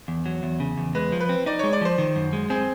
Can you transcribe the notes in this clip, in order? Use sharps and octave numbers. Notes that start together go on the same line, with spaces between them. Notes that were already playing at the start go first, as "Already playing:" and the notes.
E2
F#3
E2
C#3
E2
G#3 B4
F3
B4
C4
D#4 D5
G#3 C#5
D5
F3 C5
D#3
F#2
G#3
C4 G#4